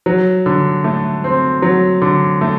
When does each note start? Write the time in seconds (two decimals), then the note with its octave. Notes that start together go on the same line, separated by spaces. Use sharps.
0.06 F#3
0.46 D3
0.84 A3
1.24 C4
1.62 F#3
2.02 D3
2.41 A3